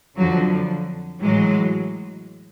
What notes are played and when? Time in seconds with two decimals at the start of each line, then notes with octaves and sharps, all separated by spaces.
0.17 F2 D3 F3 F#3
1.22 A2 E3 F#3 G#3